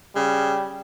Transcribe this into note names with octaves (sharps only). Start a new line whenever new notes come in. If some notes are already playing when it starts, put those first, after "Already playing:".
C#3 G3